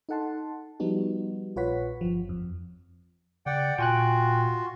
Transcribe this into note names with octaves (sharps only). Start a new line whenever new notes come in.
D#4 A4 F#5 A5 C6
F3 G3 B3 D#4 F#4
A#1 F4 B4 C#5 F#5 B6
G1 F3
F2
C#3 D5 F#5 G5
A#2 F4 F#4 G5 G#5 F#6